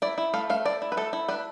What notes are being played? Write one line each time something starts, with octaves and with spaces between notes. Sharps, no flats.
E4 D5
E4
A3 F5
A3 F5
E4 D5
E4
B4
A3 A4
E4
D4 B4